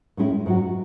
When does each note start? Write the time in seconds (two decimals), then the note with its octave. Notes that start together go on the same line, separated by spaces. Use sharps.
0.17 A2 G#3 C#4 E4
0.46 G#2 F#3 C#4 F#4